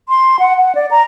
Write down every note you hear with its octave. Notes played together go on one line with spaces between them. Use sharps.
C6
F#5
F#5
D5
A#5